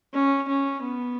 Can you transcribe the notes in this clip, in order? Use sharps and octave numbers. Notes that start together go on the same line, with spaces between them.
C#4
C#4
B3